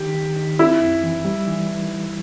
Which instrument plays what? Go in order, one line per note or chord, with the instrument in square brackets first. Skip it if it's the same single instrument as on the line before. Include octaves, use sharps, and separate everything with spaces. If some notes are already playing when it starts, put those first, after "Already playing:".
Already playing: [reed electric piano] D#3 [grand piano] G4
[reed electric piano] D#3
D#3
[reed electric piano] C4 [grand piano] E4
[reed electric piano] F#2
E3
G3
E3